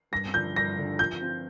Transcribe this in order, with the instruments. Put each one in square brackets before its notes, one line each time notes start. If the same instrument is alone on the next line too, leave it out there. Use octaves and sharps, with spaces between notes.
[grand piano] G2 [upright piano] A#6
[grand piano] D3 F3 D4 [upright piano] G6
[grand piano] G2 [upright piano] A#6
[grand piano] D3 F3 D4
[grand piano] F3 [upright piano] G6
[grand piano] C4 F4